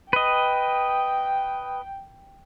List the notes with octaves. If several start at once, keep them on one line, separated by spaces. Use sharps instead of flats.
B4 D#5 G5